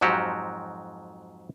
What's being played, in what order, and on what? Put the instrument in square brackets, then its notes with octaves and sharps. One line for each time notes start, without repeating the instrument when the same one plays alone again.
[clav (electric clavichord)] F2 G#2 F3 F#3 F#4 G4